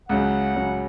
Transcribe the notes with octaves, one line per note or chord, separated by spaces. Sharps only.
C#2 C#3 F#3 F#5
C#2 C#3 F#3